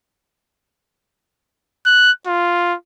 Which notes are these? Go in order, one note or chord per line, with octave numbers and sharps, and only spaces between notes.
F#6
F4